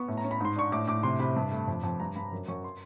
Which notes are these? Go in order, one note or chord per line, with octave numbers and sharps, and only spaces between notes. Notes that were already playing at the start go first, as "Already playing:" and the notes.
Already playing: B3 C#6
A2
A#5
C#4
B5
G#2 C6
D4 C#6
A2 D6
A2 D6
C3 C6
C3 B5
G2
A3
F2
F2
G2 A#5
G2 B5
F#2
F#2 C#6
C6